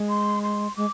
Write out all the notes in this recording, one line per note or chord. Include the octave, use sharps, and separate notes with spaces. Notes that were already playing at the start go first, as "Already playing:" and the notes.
Already playing: G#3
C6
C6
G#3 D6